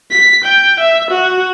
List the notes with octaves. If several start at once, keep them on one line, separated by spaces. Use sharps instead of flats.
B6
G5
E5
F#4